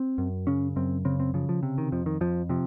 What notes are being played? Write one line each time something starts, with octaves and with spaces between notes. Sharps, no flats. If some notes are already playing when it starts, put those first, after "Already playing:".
Already playing: C4
F#2
C#3 C#4
F#2 C4
C#3 C4
C4
C#3 F3
F3
C3
D#3
F2 F3
D#3
F2 F3
C3 F3